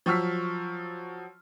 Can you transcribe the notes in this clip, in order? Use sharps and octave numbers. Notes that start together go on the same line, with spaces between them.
F3 F#3 C#6 E6 F6 B6